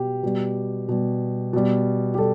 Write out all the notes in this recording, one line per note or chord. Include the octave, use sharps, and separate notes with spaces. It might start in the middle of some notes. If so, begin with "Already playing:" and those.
Already playing: B2 G4
B2 G3
B2 G3
B2 G3
G4
G3 A4